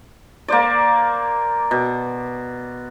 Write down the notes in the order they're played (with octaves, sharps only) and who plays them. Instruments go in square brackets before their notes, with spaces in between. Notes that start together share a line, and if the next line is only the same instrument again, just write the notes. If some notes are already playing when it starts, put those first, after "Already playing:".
[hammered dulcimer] A#3 C5 D5
B2